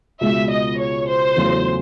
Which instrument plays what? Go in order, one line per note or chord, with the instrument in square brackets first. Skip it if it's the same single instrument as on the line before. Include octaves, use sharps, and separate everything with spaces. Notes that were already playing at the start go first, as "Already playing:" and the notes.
[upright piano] C#2 B2 G#3 [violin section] E5
[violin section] D#5
C#5
C5
[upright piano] E2 C#3 F#3 A3